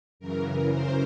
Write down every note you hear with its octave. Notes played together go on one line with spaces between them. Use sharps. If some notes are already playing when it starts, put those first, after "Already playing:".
F#2 C#3 E3 A#4
C5